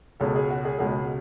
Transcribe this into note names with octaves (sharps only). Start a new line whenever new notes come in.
C#2 B2 G#3 C#4 A4
G#4
F#4
G#4
C#2 B2 G#3 C#4 G#4